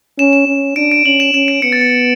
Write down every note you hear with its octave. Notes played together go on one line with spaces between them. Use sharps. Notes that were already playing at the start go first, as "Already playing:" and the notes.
C#4 E7
E7
C#4
D4 D7
D7
C#4 F#7
E7
C#4 E7
D7
B3 C#7
A6
C#7